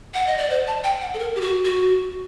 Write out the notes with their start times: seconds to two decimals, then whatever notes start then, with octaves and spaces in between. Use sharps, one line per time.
0.14 F#5
0.27 D#5
0.38 D5
0.50 C5
0.67 A5
0.84 G5
1.01 F#5
1.14 A4
1.19 A#4
1.35 G4
1.41 F#4
1.65 F#4